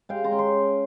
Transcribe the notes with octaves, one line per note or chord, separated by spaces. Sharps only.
G#3 F5 G5
A#5 C6
C#4
C6